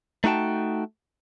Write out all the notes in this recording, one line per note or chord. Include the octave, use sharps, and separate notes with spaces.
A3 D#4 F#4 G5 A5